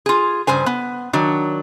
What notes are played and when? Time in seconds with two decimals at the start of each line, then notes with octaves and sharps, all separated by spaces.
0.06 F4 G#4
0.47 G2 C#3 C5 G#5
0.66 B3
1.13 D#3 F#3 D4